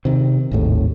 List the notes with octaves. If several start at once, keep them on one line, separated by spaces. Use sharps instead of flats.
C3 D#3
G#1 D#2 A2